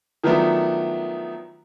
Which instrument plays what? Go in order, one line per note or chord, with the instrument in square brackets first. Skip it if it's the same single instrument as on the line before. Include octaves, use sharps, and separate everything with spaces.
[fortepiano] D#3 F3 F#3 A3 B3 D4